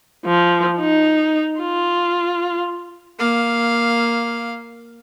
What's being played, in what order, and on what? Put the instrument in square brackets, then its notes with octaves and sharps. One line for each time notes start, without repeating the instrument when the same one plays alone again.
[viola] F3
D#4
F4
[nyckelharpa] A#3 F5